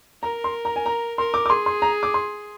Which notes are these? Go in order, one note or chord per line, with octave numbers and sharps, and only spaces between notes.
A#4 A#5
C6
A#5
G#5
A#5
A#4 C6
D6
D6
G#4 C6
C6
A#5
D6
C6